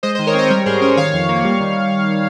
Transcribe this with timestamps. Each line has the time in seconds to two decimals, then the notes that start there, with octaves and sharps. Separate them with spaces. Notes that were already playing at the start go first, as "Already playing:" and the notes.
0.03 G#3 C5 D#5
0.15 D#3 C5 D#5
0.27 A#4 C#5
0.35 C4 C5 D#5
0.50 G3 A#4 C#5
0.66 G#2 G#4 C5
0.81 C#4 A#4 C#5
0.97 D#3 C#5 F5
1.14 F2
1.29 A#3
1.44 G3
1.60 D#3